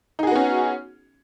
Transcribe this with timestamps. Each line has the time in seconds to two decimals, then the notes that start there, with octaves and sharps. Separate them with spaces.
0.19 D#4
0.23 G#4
0.27 F#4
0.31 B3
0.36 C#4